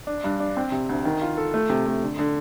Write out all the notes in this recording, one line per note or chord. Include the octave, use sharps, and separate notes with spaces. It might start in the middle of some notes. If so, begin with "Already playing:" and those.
D4
G2
D4
C4
C3
D2
D#3
F4
A4
A3
C3
A3
D3
D3